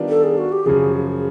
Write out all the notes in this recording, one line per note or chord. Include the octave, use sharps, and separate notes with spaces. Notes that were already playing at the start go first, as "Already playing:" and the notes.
Already playing: D#3 G3 B3 D4 F4
A4
G#4
F#4
G4
F#2 C#3 F3 G#4